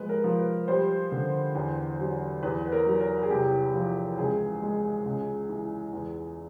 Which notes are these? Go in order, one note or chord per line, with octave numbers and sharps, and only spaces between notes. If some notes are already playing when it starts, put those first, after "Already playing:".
Already playing: F3 G#3 B4
A#4
F3
B4
G3 C5
D3
E2
F#3
E2 B4
B4
A#4
F#3
A#4
G#4
C2 G4
F3
C#2 G#4
G#3
C#2
E3
E2